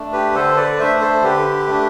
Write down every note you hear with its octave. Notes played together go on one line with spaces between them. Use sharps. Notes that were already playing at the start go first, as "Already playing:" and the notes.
Already playing: A3 D4
G4 B4
D3 A4 C5
B4 D5
A3 D4 C5 E5
A4 C5
D3 G4 B4
A3 D4